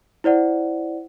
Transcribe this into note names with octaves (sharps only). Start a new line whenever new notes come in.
E4 C5 D5 F#5